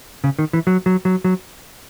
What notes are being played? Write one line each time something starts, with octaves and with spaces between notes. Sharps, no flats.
C#3
D#3
E3
F#3
F#3
F#3
F#3